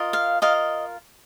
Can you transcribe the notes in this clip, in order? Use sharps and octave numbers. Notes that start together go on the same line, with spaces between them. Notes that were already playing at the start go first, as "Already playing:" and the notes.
Already playing: F4 A#4 D#5
F5
F4 A#4 D#5 F5